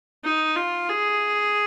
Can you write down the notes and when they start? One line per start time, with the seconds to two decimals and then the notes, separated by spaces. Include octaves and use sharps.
0.24 D#4
0.56 F4
0.88 G#4